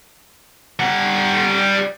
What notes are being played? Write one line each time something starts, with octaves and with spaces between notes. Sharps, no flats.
G3 F#5